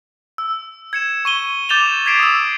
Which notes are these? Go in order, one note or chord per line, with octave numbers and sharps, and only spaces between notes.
E6
G#6 C#7 E7
C#6 D#7 G7
D6 G6 A6 E7 F7 G7
G#6 B6 C7 D7 E7
D#6 E6